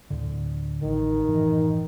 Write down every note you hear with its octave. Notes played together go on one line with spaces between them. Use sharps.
D2 A2 D3
A1 D#3
F#1 A2 E3